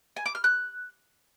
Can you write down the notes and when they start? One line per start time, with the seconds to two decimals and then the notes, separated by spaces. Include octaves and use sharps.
0.16 G#5
0.26 D6
0.35 F6
0.44 F#6